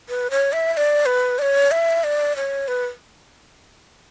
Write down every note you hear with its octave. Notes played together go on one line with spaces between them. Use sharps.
B4
C#5
E5
E5
D5
B4
D5
C#5
E5
D5
C#5
B4